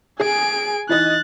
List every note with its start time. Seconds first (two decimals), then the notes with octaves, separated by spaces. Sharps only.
0.20 G#4 G#5 D7
0.89 E3 D#4 D#5 F#6 A6